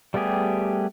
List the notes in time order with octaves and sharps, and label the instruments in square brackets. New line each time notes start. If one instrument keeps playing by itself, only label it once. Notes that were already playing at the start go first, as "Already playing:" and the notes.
[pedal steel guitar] G3 A3 B3 G4 G#4